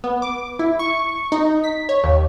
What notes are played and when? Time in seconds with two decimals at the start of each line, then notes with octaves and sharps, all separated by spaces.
0.04 B3
0.22 D6
0.59 E4
0.79 C#6
1.32 D#4
1.64 B6
1.89 C#5
2.04 D#2